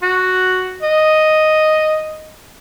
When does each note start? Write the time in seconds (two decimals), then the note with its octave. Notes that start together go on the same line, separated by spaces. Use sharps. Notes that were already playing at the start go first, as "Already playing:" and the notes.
0.02 F#4
0.82 D#5